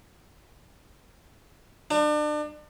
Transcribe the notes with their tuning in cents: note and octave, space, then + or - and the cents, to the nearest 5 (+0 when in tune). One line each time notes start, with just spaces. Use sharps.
D4 +35